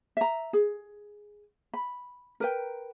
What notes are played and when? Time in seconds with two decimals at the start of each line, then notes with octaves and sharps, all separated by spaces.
0.17 E5 A#5
0.53 G#4
1.74 B5
2.40 A#4 B4 G5